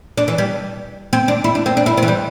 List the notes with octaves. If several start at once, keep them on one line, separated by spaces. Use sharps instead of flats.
D4
E3
G3
C4
D4
E4
D4
C4
D4
E4
C4
E3
G3